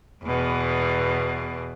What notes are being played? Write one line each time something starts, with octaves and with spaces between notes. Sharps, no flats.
E2 B2